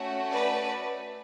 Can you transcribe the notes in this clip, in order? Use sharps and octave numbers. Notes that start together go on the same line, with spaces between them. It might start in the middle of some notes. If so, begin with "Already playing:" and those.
Already playing: A3 C#4 F#4
B4 D5